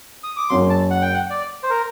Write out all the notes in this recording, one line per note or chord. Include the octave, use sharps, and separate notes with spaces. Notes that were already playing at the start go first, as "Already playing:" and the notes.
D#6
D6
F#1 F#2 F#3 C6
A5
F#5
G5
F#5
D5
C5
A#4